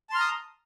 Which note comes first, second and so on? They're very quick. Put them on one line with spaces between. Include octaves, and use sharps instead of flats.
A5 C6 F6 A#5 D#6